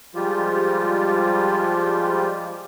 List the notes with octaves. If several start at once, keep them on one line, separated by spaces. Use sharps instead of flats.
F3 G3 G#3 F4 G4